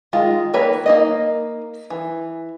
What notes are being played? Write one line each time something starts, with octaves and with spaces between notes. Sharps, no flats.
D#3 G#3 F4
D#3 A#3 B4 C#5 B5
A#3 D#4 D#5
E3